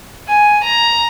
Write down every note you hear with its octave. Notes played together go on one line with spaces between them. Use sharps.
G#5
A#5